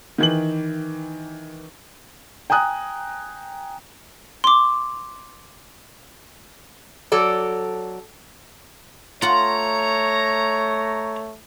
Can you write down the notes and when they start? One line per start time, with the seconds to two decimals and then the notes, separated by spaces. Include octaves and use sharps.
0.18 D#3 E3 F#7
2.50 G5 G#5 A#5 D#6 F#6
4.44 C6 D6
7.12 F#3 A4 D5
9.22 A3 F4 C#5 F#5 A#5